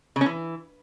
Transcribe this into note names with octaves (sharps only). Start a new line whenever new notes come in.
C#3
C#4
E3